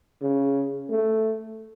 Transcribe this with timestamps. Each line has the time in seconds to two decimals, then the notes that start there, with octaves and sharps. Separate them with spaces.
0.22 C#3
0.90 A3